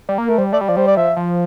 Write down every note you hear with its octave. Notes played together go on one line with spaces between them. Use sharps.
G3
A#3
A3 A#4
G3 C5
A3 D5
G3
F3 D5
G3 C5
D5
F3 E5
F3